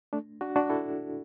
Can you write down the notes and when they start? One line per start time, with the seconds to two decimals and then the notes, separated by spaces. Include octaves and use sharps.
0.13 A3 D4
0.41 D4 F#4
0.56 D4 F#4
0.70 E4 A4